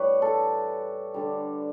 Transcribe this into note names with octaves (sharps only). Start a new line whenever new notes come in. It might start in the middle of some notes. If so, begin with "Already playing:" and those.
Already playing: A2 E3 G3 B4 C#5
A4
D3 G3